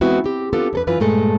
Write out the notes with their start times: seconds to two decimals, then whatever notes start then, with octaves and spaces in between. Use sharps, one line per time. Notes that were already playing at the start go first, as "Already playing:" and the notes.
0.01 E3 G#3 B3 C4 E4 F#4
0.24 C4 G4
0.53 B3 C4 D4 F4 G4 A4
0.73 F2 A4 B4
0.87 F#2 E3 F4 B4
1.00 G2 A#2 G#3 A3 A4